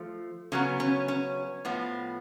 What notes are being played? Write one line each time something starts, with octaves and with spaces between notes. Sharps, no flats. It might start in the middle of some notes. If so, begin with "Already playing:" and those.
Already playing: F3 A3
C#3 F#3 B3 C#4
C#4
C#4
A2 F3 B3